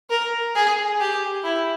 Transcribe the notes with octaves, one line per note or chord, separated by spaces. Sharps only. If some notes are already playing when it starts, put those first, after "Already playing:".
A#4
G#4
G4
E4